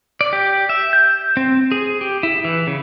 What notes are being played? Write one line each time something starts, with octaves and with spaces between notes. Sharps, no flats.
D5
G4
E5
G6
C4
G#4
G4
E4
E3
C#3